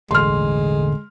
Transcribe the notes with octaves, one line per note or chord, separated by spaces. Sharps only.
E1 A1 D3 G#3 C6 F6